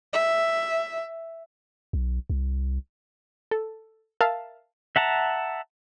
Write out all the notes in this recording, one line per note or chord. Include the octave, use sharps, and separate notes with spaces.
E5
B1
C2
A4
A#4 E5 F5 A5
E5 F#5 A5 A#5